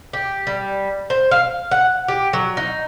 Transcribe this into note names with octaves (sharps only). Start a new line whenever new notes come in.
G4
G3
C5
F5
F#5
G4
F#3
D#4